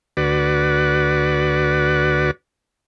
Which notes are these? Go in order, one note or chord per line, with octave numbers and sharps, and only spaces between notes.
D2 F#4 B4 D5